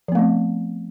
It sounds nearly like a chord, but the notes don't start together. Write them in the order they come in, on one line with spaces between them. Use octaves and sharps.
F3 B3 A3 C4